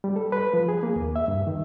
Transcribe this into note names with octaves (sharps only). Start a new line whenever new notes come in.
G3
A4
B4
F3
G#4
A#3
D#2
E5
G2
D#3